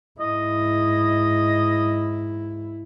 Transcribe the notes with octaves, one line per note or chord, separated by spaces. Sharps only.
G#2 E4 D#5